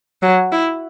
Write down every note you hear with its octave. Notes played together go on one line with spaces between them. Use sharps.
F#3
E4